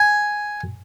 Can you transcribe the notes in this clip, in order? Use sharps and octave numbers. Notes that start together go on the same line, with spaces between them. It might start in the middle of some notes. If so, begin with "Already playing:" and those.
Already playing: G#5